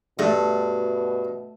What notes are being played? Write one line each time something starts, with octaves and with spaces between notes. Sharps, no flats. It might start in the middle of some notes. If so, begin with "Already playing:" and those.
G2 B2 A3